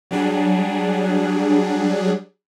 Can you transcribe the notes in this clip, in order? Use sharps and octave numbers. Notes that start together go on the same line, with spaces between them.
F#3 G3 D4 G#4